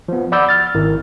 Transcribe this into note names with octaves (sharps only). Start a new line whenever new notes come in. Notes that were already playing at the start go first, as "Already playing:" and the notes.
F3 B3
D5 F#5 B5 D6 E6 G6
F6 A6
G#1 E4 A#4